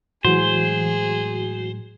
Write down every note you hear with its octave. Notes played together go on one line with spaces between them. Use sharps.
A2 E3 F#3 G#3 F#4 G#4 C5